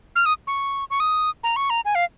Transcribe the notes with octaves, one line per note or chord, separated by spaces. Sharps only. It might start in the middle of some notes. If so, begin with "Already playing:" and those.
F6
D#6
C#6
C#6
D#6
A#5
C#6
A#5
G#5
F5